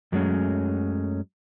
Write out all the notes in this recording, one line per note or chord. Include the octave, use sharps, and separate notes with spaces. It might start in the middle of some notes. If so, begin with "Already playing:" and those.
F#2 F#3 G#3 A3 C4 C#4